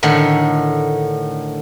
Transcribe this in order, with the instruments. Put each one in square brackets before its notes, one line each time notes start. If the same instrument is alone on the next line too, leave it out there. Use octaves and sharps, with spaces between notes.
[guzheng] A2 D3 D#3